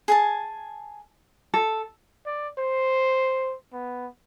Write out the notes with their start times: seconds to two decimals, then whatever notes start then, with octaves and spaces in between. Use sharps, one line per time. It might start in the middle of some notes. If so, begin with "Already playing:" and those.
0.08 G#4 G#5 A5
1.54 A4
2.26 D5
2.58 C5
3.73 B3